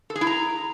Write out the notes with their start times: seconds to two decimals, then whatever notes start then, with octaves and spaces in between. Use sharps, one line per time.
0.10 A4
0.16 G#4
0.21 E4
0.27 A#5